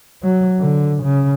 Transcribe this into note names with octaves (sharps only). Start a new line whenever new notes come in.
F#3
D3
C#3